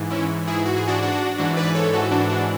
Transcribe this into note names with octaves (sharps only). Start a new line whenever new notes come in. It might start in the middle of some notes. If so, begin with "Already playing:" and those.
Already playing: G#2 E3
C#4 E4
E4 G#4
F#4
G#4
D4 F#4
D4 F#4
G#2 E3 D4 F#4
B4 D5
A4 C#5
F#4 A4
D4 F#4
D4 F#4